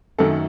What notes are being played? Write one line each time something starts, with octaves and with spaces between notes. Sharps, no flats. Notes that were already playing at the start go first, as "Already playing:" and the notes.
F#2 D#3 F#3 A3 A4